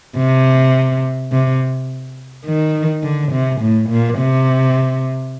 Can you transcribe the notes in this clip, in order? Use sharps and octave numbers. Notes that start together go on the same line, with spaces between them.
C3
C3
D#3
D3
C3
A2
A#2
C3